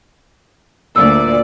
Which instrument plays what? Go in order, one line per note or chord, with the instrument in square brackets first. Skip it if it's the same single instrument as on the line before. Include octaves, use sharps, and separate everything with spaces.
[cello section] D2 A#2 D5 [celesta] E6